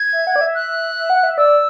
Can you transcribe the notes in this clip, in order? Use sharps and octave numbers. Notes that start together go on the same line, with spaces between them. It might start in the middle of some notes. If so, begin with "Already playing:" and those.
Already playing: G#6
E5
F#5
D5
E5
F#6
E5
F#5
E5
D5 E6